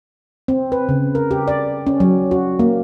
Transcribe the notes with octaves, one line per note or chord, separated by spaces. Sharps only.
C4
B4
C#3
A#4
G4
D5
C#4
F#3
F#4
A#3